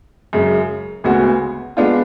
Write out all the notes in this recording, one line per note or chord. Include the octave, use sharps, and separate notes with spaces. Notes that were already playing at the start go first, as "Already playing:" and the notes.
F#2 C#3 G#3
D2 C#3 G#3 B3 F#4
G#3 B3 D4 F4